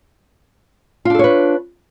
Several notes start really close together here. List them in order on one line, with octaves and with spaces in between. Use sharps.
F4 D4 A4 C#5 B4